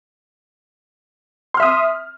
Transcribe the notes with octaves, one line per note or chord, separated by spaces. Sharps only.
E5 C6 D#6 F6